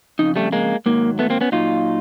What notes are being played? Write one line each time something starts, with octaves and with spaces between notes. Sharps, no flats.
F2 C#3 D#4
G3 A3
G#3 A#3
G#2 D#3 F#3 A#3
A3 B3
A#3 C4
B3 C#4
A#2 F#3 D#4 F4